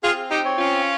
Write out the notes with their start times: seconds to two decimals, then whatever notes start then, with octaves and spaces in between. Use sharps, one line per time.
0.03 C4 F4 G#4
0.31 D#4 G4
0.45 C#5
0.58 C#4 F4